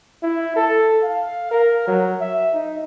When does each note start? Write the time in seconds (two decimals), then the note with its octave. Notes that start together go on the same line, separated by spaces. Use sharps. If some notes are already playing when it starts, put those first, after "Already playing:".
0.23 E4
0.56 A4
1.03 F5
1.51 A#4
1.87 F#3
2.21 E5
2.54 D#4